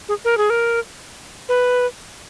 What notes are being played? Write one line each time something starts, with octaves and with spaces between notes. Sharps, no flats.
G#4
A#4
G#4
A#4
B4